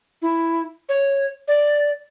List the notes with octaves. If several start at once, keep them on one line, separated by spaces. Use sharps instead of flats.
E4
C#5
D5